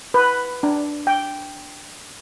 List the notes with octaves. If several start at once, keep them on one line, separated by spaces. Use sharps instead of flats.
B4
D4
G5